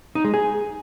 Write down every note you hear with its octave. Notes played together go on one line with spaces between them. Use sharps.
D#4
G#3
G#4